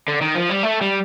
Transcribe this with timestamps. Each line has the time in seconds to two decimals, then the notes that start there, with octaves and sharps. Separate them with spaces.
0.08 D3
0.21 D#3
0.35 F3
0.49 G3
0.63 A3
0.81 G3